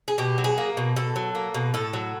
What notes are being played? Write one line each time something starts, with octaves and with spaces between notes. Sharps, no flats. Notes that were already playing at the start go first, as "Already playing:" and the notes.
G#4
B2 G4
F#3
G#4
A#3
B2
B2 A4
F#3
A#3
B2
A2 A4
F#3